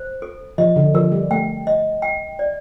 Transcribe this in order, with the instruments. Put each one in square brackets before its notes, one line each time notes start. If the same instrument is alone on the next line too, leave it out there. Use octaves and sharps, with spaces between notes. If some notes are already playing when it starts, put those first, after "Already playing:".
Already playing: [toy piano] C5
A4
[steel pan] F3 [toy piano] D#5
[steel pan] D3
[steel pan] F3 [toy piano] A#4
[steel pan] G3
[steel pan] A3 [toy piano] G5
[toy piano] D#5
G5
D5